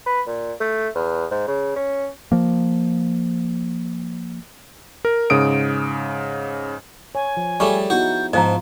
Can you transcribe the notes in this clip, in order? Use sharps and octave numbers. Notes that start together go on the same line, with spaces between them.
B4
A#2
A3
E2
G#2
C#3
C#4
F3 A#3
A#4
G#2 C#3 D#6 D7
C#5 G#5
F3
G3 A3 G4 G#4 C#5 C#6 D6
B3 D#4 E4 F#4 G6
G#2 F3 B3 F4 D#5 F5 A5 A#5